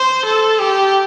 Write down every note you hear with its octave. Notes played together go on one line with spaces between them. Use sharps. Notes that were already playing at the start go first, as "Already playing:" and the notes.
Already playing: C5
A4
G4